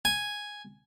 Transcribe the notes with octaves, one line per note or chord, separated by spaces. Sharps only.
G#5